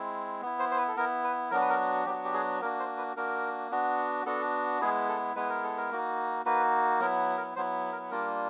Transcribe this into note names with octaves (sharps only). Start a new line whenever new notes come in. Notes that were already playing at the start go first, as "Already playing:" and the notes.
Already playing: G#3 C4 E4
B3 E4
C5
C5
B4
A4
B3 E4 A#4
B4
F#3 B3 D4 F#4 A#4
B4
A#4
F#3 B3 D4 F#4 G4
G4
G#4
A#3 D4 F#4 A#4
C5
B4
A#3 D4 F#4 A#4
B3 D4 F#4
B3 D4 F#4 A4
G#3 B3 E4 G#4
A4
G#3 B3 E4 B4
A#4
A4
A#4
A#3 D#4 F#4
A#3 D#4 F#4 B4
F#3 B3 E4 A#4
A#4
F#3 B3 E4 C5
A#4
G3 A#3 D4 F4 A#4